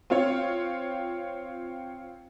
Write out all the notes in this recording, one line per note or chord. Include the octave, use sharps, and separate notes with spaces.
C4 F4 C#5